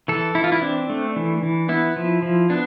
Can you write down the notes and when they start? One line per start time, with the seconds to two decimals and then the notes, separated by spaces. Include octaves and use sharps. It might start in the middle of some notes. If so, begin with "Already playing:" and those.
0.08 E3 A4
0.35 E3 E4
0.44 F4
0.52 E4
0.62 C4 D4
0.90 A3
1.16 E3
1.43 E3
1.69 B3 E4
1.96 F3
2.22 F3
2.50 B3 D4